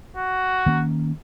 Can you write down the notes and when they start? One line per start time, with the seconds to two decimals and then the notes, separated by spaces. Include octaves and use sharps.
0.17 F#4
0.66 D#3 A#3 C#4